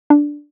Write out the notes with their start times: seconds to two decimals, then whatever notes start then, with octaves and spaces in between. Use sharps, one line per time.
0.10 D4